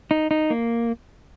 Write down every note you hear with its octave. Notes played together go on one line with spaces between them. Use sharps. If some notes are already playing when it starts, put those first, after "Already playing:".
D#4
D#4
A#3